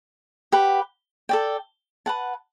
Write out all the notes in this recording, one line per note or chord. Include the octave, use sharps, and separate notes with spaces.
G4 B4 F#5
A4 D5 G5
B4 F#5 A5